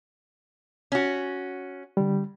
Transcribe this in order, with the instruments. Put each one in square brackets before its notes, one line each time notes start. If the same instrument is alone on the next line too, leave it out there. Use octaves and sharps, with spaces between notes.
[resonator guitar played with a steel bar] C#4 F#4
[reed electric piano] D3 G3